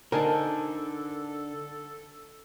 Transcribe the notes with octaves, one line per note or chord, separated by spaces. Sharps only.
D3 D#4 A4 A#4 C5 G#5 A5